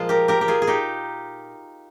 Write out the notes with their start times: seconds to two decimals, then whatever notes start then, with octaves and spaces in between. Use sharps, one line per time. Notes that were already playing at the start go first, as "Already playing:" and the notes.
Already playing: A#2 F3 G#3 F4
0.09 G4 A#4
0.28 G4 A#4
0.41 G4
0.48 F4 G#4
0.62 G#4
0.67 D#4 G4